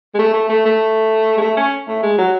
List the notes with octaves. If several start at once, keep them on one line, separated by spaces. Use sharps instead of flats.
G#3
A3
A3
A3
A3
G#3
A3
C#4
A3
G#3
F#3